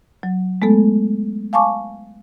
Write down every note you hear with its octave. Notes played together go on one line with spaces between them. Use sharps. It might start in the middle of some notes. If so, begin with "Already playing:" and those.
F#3
G#3 A3 B3 A4
F5 G#5 A5 C#6 D6